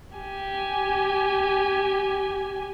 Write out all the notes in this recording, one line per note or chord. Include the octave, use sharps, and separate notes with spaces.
G4 G#5